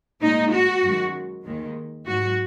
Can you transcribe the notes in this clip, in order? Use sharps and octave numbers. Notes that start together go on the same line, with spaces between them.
A#2 G#3 D#4
F#4
F#2 D#3 G#3
D#2 D#3 G#3
G#2 F#3 F#4